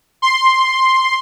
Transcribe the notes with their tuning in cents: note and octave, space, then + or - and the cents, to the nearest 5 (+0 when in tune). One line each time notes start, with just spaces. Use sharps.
C6 +5